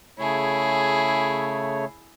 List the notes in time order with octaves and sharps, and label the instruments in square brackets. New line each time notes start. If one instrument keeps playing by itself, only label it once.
[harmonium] C#3 A3 C#5 [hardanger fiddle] E4 G#4